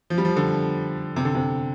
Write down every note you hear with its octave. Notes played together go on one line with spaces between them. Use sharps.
F3
G3
F3
D3
C3
D3
C3